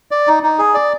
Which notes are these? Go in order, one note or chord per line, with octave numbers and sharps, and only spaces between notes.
D5
D#4
D#4
G#4
D5